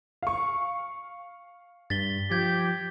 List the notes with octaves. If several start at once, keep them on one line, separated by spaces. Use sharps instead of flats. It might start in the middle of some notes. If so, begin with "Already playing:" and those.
F5 C#6
G2 A6 B6 G7
F3 G4 G6 G#6 B6